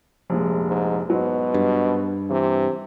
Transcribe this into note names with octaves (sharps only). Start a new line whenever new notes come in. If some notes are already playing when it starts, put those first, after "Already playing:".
F1 A#1 G#3
G#2
G#2 B2 F#3
G2
C3 E3